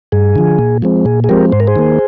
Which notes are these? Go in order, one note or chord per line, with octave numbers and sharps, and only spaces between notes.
G2 G#4
D3 F3
A#2
F3 G#3 C4
A#2 G#4
G#4
F3 G#3 C4 G4 A#4
G#2 C5
A#4
G#4 C5
D#3 A#3